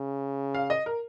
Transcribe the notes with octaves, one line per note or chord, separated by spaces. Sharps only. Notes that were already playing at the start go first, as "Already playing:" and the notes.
Already playing: C#3
F5
D#5
A#4